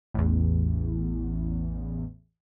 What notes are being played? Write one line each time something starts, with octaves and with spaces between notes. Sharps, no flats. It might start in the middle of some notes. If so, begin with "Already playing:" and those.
A1 E2